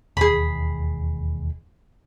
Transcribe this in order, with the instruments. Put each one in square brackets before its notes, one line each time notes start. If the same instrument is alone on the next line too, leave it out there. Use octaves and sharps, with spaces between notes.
[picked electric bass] E1 D#2 [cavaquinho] G#4 B5